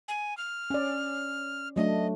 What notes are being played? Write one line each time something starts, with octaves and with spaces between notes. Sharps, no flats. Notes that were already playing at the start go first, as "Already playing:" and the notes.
G#5
F6
C#4 D5
F#3 A3 D4 D#5